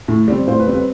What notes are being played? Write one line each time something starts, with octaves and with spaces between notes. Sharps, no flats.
A2
G3 C4
A2 C5
B4
G3 C4
B4